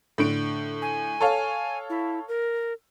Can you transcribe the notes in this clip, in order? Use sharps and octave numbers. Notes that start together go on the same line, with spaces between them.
A2 D3 D7
G#5
A4 C#5 F5
E4
A#4